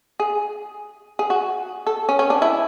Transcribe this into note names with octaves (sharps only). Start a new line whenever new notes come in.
G#4
G#4
F#4
A4
C#4
C#4
D4
E4